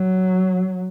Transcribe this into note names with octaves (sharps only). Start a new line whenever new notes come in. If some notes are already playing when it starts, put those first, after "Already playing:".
Already playing: F#3